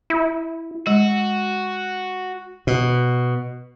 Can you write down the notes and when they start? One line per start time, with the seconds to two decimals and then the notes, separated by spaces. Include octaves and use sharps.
0.10 E4
0.87 G#3 F#4
2.67 B2